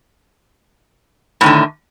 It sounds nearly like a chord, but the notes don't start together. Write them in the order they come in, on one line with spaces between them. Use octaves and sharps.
A2 D#3 D3